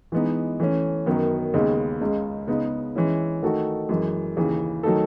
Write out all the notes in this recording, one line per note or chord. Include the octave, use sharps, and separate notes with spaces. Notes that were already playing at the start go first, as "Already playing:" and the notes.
E3 G#3 B3 D#4
E3 A3 C#4
F#2 D#3 F#3 B3
D#2 C#3 G#3 B3
C#2 C#3 G#3
C#3 G#3 B3 D#4
E3 G#3 C#4 E4
D#3 A3 D#4 F#4 A4
F#2 E3 G#3
D#2 C#3 E3
D#3 F#3 A3 D#4 A4